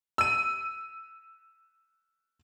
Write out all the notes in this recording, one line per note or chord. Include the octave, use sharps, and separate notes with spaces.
E6 D#7